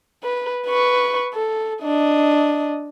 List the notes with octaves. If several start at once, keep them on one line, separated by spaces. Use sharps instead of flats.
B4
B4 C#6
A4
D4 D#5